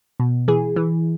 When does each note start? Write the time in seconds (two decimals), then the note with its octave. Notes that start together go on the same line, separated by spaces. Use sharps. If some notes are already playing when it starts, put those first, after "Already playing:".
0.20 B2
0.48 E3 G#4
0.76 E3